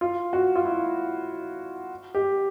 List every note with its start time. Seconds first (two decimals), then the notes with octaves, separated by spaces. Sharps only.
0.01 F4
0.33 F#4
0.56 F4
0.65 E4
2.15 G4